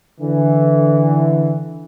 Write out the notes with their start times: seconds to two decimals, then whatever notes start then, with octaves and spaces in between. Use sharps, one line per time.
0.20 D3 E3